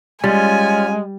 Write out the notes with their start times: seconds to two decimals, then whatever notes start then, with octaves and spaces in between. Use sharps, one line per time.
0.24 G3 G#3 C#4 F4 G#5